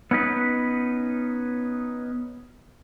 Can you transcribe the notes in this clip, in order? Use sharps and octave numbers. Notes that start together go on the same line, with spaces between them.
B3 C#4 D#4 B4